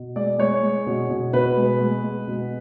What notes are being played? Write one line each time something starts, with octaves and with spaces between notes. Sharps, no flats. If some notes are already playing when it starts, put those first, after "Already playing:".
Already playing: B2
G#3 D5
G#3 C#5
G#3
B2
B2
B2 B4
G#3
G#3
G#3
B2